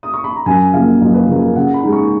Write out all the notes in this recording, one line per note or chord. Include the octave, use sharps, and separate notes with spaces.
D#6
C#6
B5
A#5
F#2 G#5
C#3 F3 A#3 F5
F#2 D#5
B4
C#3 F3 A#3 A#4
B4
A#4
C#3 F#5
B5
G#3 D#4
C#6